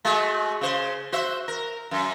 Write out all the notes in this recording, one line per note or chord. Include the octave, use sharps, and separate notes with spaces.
G#3 A3 F#4
C#3 C5
F#4 C5 E5
A#4
F#2